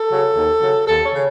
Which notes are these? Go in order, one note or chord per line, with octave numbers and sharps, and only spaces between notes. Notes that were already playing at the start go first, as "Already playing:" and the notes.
Already playing: A4
C#3 F#3
D#2
C#3 F#3
D#2 A4
C#5
C#3